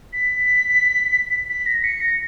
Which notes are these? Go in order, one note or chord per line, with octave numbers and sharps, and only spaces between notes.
B6
B6
A#6
C#7
A#6